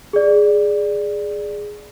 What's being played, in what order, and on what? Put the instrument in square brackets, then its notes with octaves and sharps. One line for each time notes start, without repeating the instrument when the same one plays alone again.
[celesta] G#4 D5